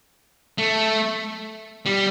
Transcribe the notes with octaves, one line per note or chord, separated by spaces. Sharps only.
A3
G3